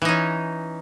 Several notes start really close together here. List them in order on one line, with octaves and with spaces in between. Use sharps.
E3 D#4 C#4